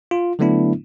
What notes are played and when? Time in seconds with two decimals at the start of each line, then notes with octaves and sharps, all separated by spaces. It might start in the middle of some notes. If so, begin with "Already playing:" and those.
0.11 F4
0.39 D3 F#3 A3 B3 D4 E4